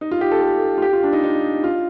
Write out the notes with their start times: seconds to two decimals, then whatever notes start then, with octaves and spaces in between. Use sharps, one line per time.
0.01 D#4
0.11 F4
0.21 G4
0.32 A4
0.42 A4
0.78 F4
0.82 G4
0.93 F4
1.03 D4
1.13 D#4
1.23 D#4
1.64 F4